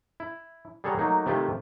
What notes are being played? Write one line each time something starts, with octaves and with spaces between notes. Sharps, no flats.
E4
G3 G#4 A4 C#5 F#5 A#5
F#3 A3 A#3 D#4
C3 D#3 A3 E4 F4 G4